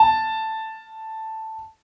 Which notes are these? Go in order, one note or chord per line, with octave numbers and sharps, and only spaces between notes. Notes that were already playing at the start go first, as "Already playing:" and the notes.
Already playing: A5